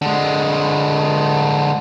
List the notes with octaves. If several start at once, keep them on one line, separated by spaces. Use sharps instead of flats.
D3 G#3